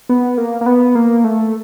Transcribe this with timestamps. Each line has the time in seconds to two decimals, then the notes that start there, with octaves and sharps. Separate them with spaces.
0.09 B3
0.38 A#3
0.61 A#3
0.66 B3
0.95 A#3
1.24 A3